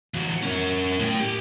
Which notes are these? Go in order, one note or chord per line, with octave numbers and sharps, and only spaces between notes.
E3 F#4
C#4 A#4
A2 G5
G4